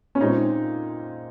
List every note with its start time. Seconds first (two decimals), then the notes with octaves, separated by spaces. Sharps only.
0.15 C#4
0.20 A#2 G#3 C4 D#4